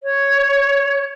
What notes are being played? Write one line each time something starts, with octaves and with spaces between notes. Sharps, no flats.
C#5